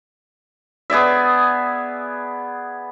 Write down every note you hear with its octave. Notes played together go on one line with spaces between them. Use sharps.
B3 G#4 D5 E5